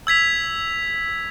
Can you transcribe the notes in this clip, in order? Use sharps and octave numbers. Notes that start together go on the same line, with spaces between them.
E6 G#6 B6 F7